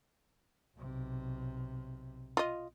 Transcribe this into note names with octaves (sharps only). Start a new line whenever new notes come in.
B1 C3
F4 D#5